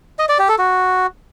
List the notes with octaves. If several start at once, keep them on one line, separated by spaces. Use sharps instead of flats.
D#5
D5
G4
A4
F#4